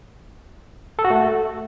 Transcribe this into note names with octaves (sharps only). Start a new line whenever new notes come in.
A4
F#4
A3